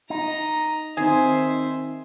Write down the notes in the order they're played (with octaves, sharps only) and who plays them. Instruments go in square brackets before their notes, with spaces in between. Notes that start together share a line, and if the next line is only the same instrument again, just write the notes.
[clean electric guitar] D#4 [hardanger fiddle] D#5 A#5
[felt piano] D#3 C4 [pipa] G#4 [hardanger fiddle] C5 E5